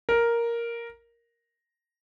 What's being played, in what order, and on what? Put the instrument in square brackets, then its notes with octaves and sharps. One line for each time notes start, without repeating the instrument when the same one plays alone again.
[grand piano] A#4